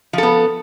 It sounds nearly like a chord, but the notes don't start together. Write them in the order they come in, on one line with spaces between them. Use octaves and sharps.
F3 A4 B3